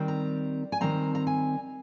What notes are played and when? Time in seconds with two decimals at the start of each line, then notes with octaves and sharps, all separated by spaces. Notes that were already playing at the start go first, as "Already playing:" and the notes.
Already playing: D#3 G3 C4
0.08 A#5
0.72 G#5
0.81 D#3 G3 C4 A#5
1.15 A#5
1.27 G#5